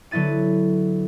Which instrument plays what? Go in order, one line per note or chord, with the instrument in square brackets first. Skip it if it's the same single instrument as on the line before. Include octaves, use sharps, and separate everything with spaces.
[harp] D3 F#3 B3 E4 A6 D#7